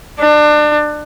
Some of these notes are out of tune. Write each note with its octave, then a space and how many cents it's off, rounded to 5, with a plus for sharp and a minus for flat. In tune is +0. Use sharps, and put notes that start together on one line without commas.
D4 +30